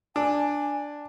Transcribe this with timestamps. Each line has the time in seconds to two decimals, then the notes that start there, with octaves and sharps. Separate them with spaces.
0.16 D4 G#5